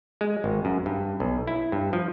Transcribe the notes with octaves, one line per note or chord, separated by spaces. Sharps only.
G#3
G#1
F#2
G2
B1
E4
G2
F3